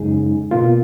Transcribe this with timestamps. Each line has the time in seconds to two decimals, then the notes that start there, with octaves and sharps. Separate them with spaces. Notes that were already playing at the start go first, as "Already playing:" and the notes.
Already playing: F#2 C#3 G#3 D#4 G#4
0.51 B2 A#3 F4